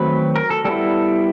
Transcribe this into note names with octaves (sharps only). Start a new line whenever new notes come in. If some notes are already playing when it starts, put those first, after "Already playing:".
Already playing: D#3 F#3 A3 C4 B4
A#4
A4
G3 B3 E4 A4